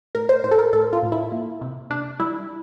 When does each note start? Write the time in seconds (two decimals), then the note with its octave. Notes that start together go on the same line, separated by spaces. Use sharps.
0.15 A2 A#4
0.29 C5
0.44 A2 C5
0.51 A4
0.59 A#4
0.73 A2 A4
0.93 F4
1.03 A2
1.12 E4
1.32 A#3
1.61 C3
1.90 C3 D4
2.20 G3 E4